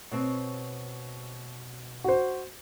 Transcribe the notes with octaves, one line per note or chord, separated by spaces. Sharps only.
B2 C4 C#5
F#4 C5